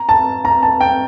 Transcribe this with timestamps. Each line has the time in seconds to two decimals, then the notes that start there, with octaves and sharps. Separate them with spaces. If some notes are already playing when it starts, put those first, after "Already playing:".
Already playing: A#5
0.09 A5
0.45 A#5
0.63 A5
0.81 G5